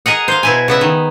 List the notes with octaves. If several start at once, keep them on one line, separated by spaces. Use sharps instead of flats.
G#4 A#4 D#5 F#5
C5 F5
B2 E4 G#5
C#3 B3 E5
D#3